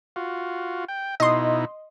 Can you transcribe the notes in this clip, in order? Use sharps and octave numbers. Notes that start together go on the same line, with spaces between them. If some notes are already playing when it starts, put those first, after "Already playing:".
F4 F#4
G5
B2 D#4 E4 D#5 C6